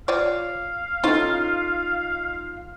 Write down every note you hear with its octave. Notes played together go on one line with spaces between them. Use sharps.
F4 C#5 D5 F5
C#4 D#4 F4 A4